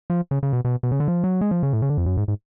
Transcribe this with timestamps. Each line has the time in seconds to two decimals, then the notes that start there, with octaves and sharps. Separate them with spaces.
0.10 F3
0.31 C#3
0.43 C#3
0.53 B2
0.65 B2
0.83 B2
0.91 C#3
1.00 D3
1.08 F3
1.24 F#3
1.41 G#3
1.51 F3
1.63 C#3
1.73 A2
1.82 C#3
1.89 D3
1.98 F2
2.06 F#2
2.17 G#2
2.28 G#2